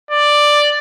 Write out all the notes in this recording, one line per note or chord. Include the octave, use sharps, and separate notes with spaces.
D5